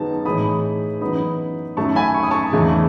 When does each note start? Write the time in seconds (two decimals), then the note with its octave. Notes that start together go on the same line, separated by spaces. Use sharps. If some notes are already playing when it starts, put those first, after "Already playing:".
Already playing: F#2 D#3 G#3 B3 D#4 A5
0.25 A2 E3 G#3 D#4 B5 D#6
1.01 F#2 E3 B3 D#4 B5 D#6
1.77 F#2 D#3 A3 A5 C#6
1.96 G#5 B5
2.14 C#6
2.23 D#6
2.31 A5 C#6
2.53 E2 C#3 E3 A3 D#4